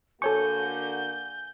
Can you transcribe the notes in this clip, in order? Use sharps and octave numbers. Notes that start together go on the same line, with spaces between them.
D3 A#3 F#4 A4 C#5 G#5 C#6 G6